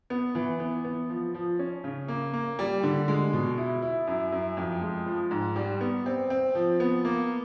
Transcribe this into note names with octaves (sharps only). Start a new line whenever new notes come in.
B3
E3
B3
B3
F3
F3
C#4
C#3
A#3
A#3
G3
D3
G#3
B2
E4
E4
F#2
F#2
F2
G#3
F3
G#2
G3
B3
C4
C4
F3
B3
A#3